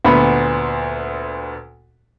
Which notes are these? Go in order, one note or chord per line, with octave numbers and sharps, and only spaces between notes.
D2 A#2 B3 B5